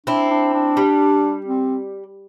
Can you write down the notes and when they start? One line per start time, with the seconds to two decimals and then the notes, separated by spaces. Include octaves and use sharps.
0.06 C4 D4 E4
0.30 D4
0.53 D4
0.77 G3
1.46 C4